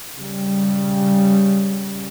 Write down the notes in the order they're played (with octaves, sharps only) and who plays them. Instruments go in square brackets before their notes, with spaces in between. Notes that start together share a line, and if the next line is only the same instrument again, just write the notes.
[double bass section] C#3 G3